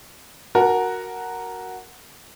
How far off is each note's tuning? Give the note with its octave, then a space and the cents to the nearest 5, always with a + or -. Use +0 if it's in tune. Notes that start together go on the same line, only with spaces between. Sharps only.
F#4 +0 A#4 +0 A5 -25